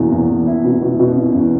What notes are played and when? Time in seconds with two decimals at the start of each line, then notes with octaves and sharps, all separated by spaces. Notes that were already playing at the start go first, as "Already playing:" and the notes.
Already playing: E2 B2 A#3
0.11 E2
0.29 E2
0.47 E4
0.64 B2
0.82 B2
0.99 B2
1.17 E4
1.35 E2